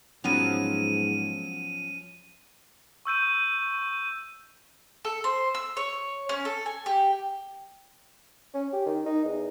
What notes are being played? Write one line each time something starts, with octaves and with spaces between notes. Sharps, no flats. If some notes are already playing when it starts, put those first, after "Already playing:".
G#2 F3 F#3 B3 C#4 D#7 F7
C#6 E6 G6 D#7
A4
C5
E6
C#5
C#4
A4
G#5
G4
C#4
G4
D#3
D#4
E2